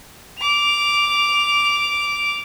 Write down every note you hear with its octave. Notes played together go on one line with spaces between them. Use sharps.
D6 F7